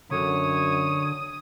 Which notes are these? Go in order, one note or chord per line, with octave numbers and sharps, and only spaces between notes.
F#2 D3 C#5 D#6